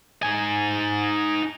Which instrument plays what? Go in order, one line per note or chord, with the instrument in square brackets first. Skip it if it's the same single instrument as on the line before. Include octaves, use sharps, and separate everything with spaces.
[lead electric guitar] D#4 G#5